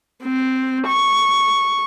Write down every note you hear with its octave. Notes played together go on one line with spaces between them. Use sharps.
C4
C#6